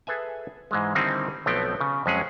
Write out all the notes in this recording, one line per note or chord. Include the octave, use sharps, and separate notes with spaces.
G#4 A4 B4 E5 G#5
G#2 E3 G#3
D3 D#3 G3 C4 D#4 E4
B1 F3 A3 B3 C4 G5
C#3
F2 F#3 G#3 C#4 G#4